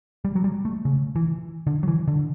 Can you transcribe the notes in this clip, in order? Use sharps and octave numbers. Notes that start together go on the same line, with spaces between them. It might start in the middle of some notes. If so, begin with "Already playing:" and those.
G3
F#3
G3
A3
C#3
E3
D3
F#3
E3
D3